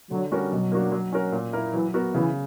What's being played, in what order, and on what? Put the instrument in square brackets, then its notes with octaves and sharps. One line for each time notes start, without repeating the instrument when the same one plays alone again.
[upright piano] D3 [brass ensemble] F#3
[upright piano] G3 C#4 F#4 A#4
[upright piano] B2 [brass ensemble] F#3
[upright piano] A#3 D4 F#4
F#3
C#4 F#4 A#4
A#2
A#3 E4 A#4
[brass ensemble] E3 [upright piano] F#3
[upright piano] B3 F#4 A#4
[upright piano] C#3 [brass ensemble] E3